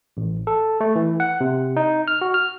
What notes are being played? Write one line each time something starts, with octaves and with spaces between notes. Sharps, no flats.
A1
A4
A3
E3
F#5
C3
D#4
F6
F#4
F6